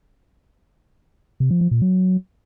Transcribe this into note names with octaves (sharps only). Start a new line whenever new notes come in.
C3
F3
F3
A#2
F#3